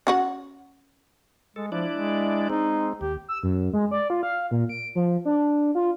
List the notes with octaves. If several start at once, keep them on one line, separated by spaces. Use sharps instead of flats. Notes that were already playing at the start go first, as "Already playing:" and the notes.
C#4 F#4 F#5
G#3 A4
F3 D4 E4 D5
G#3
G#3 C4 D#4
D#2 G4
E6
F#2
G#3
D5
F4
F5
A#2
D7
F3
D4
F4